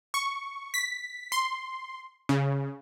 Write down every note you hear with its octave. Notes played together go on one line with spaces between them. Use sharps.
C#6
B6
C6
C#3